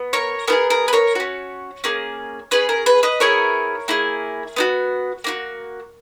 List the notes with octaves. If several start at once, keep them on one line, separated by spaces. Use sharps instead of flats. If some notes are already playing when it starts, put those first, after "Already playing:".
Already playing: B3
A#4 C#5
B3 E4 G#4 A#4
A#4
B4
A#4 C#5
C#4 F#4
A#3 C#4 G#4
C#4 G#4 B4
A#4
B4
B4 D#5
B3 E4 G#4 A#4 C#5
A#3 E4 G#4
B3 D#4 F#4
A#3 D#4 F#4